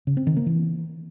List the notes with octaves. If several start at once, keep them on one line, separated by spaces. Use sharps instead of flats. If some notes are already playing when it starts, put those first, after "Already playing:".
C#3
C4
D#3
A#3
E3